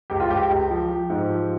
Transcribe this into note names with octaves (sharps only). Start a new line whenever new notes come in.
C#2 G4
F4
C#2 G4
C#2
F3
F3
G#2
F3